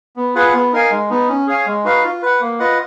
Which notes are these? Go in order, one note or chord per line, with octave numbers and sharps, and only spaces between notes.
B3
F4 G#4 B4 F#5
B3
D#4 A#4 F5 G#5
G#3
B3 D#4
C#4
G#4 C#5 F5 G#5
G#3
D#4 F#4 B4 F5
F4
B4 F#5
A#3
F4 B4 D#5 F#5